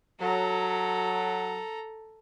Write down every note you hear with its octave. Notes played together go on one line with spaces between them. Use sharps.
F#3 A4 A#5